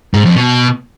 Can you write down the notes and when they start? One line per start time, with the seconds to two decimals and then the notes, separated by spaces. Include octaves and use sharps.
0.14 G#2
0.25 F2
0.36 B2